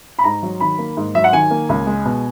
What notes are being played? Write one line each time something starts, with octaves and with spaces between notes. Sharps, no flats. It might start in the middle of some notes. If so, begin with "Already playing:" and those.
B5
G#2 A#5
F#3
D#3 B5
A#3
G#2
F#3 E5
F#5
D#3 G#5
A#3
C#2
G#3
B2